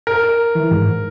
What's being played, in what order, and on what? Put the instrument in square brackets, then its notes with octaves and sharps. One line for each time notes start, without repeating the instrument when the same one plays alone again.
[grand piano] A#4
[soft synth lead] E3
G#2